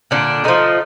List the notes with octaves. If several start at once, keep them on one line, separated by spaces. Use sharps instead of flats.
A#2 D3 D4
D#3 F3 A3 D#4